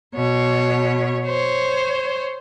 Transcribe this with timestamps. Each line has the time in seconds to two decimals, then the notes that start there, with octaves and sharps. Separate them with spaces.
0.15 B2 C#5
1.25 C5 C#5